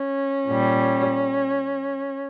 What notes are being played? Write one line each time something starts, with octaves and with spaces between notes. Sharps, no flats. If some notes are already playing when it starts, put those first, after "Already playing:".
Already playing: C#4
A#2 G3